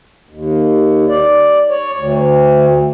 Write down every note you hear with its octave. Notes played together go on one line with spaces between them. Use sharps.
D#2
D5
C#5
D2